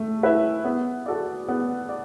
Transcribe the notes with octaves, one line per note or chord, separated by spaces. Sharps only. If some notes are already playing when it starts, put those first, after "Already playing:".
Already playing: A3 E5
E4 B4 E5
B3
F#4 A4 D5
B3
D5